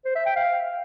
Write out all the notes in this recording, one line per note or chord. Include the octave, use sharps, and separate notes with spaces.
C5
E5
G5
F5